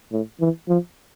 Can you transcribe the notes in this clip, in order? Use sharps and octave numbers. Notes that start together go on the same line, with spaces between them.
A2
E3
F3